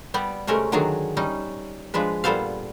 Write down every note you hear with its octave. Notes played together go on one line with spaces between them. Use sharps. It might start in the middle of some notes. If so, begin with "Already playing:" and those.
G3 B3 G4 D5
C3 G#3 A3 C#4 A#4
D3 D#3 F#3 D4 G#4 A#5
G3 C#4 D#4
F3 G#3 D4 B4
A#2 G3 B3 A4 C5 F5